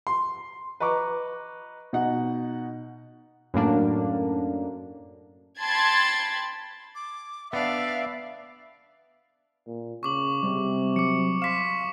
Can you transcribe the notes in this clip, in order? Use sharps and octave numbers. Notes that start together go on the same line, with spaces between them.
C6
B4 D#5 A#5 C#6 D6
B2 D#4 F#5
F#2 A2 A#3 D4
G5 A5 B5 C6 G#6 A6
D6
B3 D4 D5 E5 F5
A#2
C#3 C#6 D6 F#7
C3 G3
F#3 D6 C#7
F5 C6 C#6 B6 E7